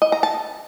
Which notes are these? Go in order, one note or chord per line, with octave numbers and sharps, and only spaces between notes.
D#5
A#5
A5